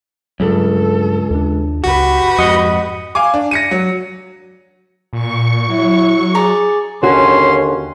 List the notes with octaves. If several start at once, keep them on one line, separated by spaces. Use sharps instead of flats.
C#2 G2 F#3 A4
D#2 D4
F#1 C#2 F#4 G4 B4
F2 G#2 D#5 F#5
F5 G#5 D6
D4
A#6 C#7 D#7
F#3
A#2 C#6
F#3 E4
G#4 D5 A#5
D#2 D3 C#4 F#4 C6